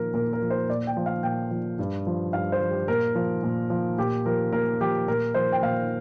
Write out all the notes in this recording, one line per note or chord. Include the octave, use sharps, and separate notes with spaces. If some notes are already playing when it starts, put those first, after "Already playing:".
Already playing: A#2 F3 A#4
A#2 A#4
A#4
F3
C5
A#2 D5
G5
F3
F5
A#2 G5
F3
G2
F3
G2 F5
C5
F3
G4
A#2 A#4
F3
A#2
F3
A#2 G4
F3 A#4
A#2 A#4
F3 G4
A#2 A#4
F3 C5
G5
A#2 F5